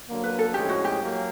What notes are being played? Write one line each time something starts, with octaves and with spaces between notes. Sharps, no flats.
D3 F#3 A#3
B4
A4
A2 F3 G#3 C#4 G4
F#4
G4
F#3 A#3